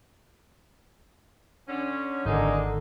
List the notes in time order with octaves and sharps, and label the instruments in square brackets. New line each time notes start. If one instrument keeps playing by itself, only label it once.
[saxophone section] D3 C#4
[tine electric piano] G#1 [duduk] D3 [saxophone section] G#3 A#3 D#4